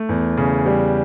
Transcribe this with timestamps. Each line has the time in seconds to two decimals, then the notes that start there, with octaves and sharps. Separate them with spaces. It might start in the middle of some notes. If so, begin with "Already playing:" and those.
Already playing: A3
0.09 E2
0.37 C#3
0.66 G3